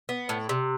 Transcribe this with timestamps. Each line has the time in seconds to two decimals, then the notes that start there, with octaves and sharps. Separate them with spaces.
0.09 B3
0.29 A2
0.49 C3